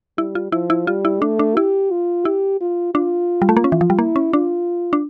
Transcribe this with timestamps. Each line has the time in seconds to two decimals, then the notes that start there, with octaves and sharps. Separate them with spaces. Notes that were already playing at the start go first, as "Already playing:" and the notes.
0.18 G3 E4
0.35 F4
0.52 F3 E4
0.70 E4
0.87 G3 F4
1.05 E4
1.22 A3 D4
1.39 D4
1.57 E4 G4
1.91 F4
2.25 E4 G4
2.61 F4
2.95 D4 F4
3.42 G3
3.49 A3
3.57 A#3
3.64 C#4
3.72 E3
3.81 F3
3.90 G3
3.99 A#3 E4
4.16 C#4
4.33 D4 F4
4.93 D4